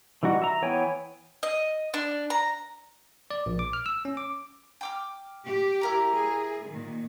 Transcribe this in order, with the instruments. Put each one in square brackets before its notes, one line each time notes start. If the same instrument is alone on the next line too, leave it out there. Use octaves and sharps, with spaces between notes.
[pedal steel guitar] E3 G3 D#4 F#4
E5 A#5
E3 B3 C#5 G5 G#5
[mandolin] D#5
D4
A#5
[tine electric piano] D5
A#1
D6
F6
E6
C#4
D6
[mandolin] G5 D6 F6
[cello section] G4
[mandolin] E4 A#4 A#5
[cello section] G#4
A#2 D#3